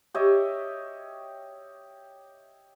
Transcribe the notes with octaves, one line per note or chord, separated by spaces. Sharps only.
G4 C#5 D#5 E5